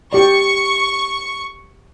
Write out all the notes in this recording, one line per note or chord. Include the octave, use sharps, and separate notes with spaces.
G4 D5 C#6